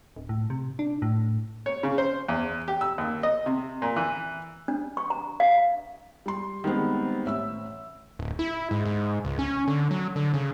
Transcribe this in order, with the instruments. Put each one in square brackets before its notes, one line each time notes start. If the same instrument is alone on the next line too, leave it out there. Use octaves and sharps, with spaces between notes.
[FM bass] D1
A2
C3
D4
A2
[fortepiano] C#5
C#3
C5
E2
G4
E6
D#2
D#5
C3
A#2
E3
[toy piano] D4
C#6
A#5
F5
[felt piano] G3 C6
D#3 G3 G#3 B3 C4
A1 E5 E6
[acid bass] D1
E4
G#2
G#2
C#2
C#4
D3
F#3
D3
C#3